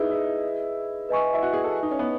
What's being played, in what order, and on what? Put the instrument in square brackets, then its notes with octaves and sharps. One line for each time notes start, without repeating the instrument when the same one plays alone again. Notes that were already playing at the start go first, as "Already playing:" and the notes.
Already playing: [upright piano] D#4 E4 [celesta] G#4 B4 D#5
[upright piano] E4
[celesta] B4 D#5 G#5 C#6
[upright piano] E4
F#4
G#4
A4
D#4
C#4
B3